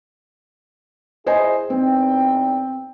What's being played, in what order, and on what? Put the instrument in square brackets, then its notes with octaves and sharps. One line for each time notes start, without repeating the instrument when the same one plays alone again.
[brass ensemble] E4 G#4 [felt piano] C5 D#5 G#5
[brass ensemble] E2 D#4 G5 [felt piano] C4